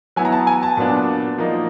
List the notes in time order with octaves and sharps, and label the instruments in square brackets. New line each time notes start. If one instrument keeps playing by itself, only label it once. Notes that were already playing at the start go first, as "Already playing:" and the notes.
[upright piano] F#3 B3 E4 G#5
A#5
A5
G#5
A5
A#2 F#3 B3 D4
F3 A#3 D#4